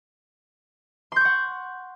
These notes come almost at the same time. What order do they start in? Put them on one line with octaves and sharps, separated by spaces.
C6 G6 C#6 F#5